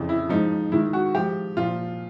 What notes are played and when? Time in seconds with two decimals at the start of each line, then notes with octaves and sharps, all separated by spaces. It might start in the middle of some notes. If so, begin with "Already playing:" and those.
Already playing: F2 C#3 E3
0.09 E4
0.29 G#2 F3 D#4
0.72 G#2 D#3 E4
0.93 F#4
1.15 G#2 F3 G4
1.57 A#2 F3 F4